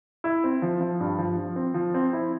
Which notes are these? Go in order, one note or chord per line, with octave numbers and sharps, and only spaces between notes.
E4
C4
F3
F3
G2
F3
F3
C4
F3
C4
E4